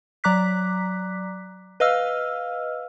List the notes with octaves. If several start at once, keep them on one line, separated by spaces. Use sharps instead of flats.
F#3 D5 A#5 D6 F#6 B6
B4 D#5 F5 E6 F6